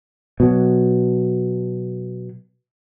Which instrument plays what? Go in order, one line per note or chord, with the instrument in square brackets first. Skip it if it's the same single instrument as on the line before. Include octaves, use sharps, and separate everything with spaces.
[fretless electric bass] B2 F#3